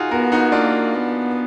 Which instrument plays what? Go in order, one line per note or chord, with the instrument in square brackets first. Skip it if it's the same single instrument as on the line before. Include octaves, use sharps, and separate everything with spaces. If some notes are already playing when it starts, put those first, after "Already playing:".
Already playing: [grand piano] D#4 F4 F#4 G#4
[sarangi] B3 [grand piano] F#4 A#4
[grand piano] D#4 F#4
[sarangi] A#3 [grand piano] D4 F4
[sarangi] B3